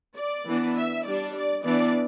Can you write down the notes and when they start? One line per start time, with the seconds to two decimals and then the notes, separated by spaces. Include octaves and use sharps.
0.17 D5
0.47 E3 B3 D4
0.77 E5
1.06 G3 D4 D5
1.35 D5
1.65 E3 B3 D4 D5